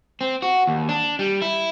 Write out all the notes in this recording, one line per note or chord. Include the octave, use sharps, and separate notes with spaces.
C4
F#4
D#2
D4
G3
E4